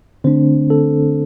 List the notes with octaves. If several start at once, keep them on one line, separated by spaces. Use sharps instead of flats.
D3 A3 C4 D4 C5
A4